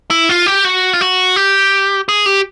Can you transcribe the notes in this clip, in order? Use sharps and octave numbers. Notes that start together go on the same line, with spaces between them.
E4
F4
G4
F#4
F4
F#4
G4
G#4
G4